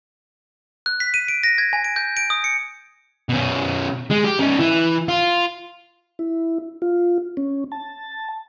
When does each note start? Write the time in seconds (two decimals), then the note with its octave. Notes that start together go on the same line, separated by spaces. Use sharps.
0.86 F#6
1.00 B6
1.14 D#7
1.28 D7
1.43 A#6
1.58 G#6
1.73 G#5
1.84 D7
1.96 G6
2.17 D7
2.30 D#6
2.44 C#7
3.29 B2 C#4
4.10 G#3
4.24 G4
4.39 C#4 D#4
4.58 E3
5.08 F4
6.19 E4
6.82 F4
7.37 C#4
7.72 A5